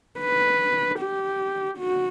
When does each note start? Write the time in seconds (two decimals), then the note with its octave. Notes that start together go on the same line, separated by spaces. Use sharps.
0.21 B4
1.00 G4
1.79 F#4